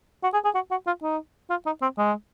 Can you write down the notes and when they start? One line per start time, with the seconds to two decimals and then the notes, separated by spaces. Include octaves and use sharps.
0.24 F#4
0.34 G#4
0.45 G#4
0.55 F#4
0.71 F#4
0.87 F4
1.03 D#4
1.50 F4
1.66 D#4
1.82 C4
1.98 G#3